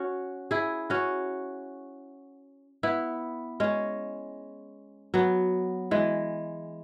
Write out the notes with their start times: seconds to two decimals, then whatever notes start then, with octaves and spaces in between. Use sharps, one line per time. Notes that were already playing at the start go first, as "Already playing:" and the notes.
Already playing: C#4 F#4
0.51 E4 G#4
0.90 C#4 F#4
2.83 B3 E4
3.60 G#3 C#4
5.14 F#3 B3
5.91 E3 G#3